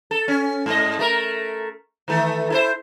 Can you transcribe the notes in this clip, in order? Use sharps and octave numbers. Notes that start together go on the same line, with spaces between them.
A4
C#4
G#2 D#5
A3 A#4
D#3 E3 A3
E4 A4 C5